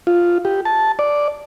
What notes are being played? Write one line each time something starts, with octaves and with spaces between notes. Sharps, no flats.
F4
G4
A5
D5